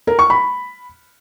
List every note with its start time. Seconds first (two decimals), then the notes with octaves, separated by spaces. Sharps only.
0.07 A#4
0.19 C#6
0.30 B5